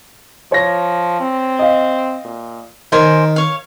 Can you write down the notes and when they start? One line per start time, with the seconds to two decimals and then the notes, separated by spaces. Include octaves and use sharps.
0.52 F3 C#5 A#6
1.20 C4
1.59 D#5 F5
2.25 A#2
2.92 D#3 A#4 C5 G#5
3.36 C#5 F5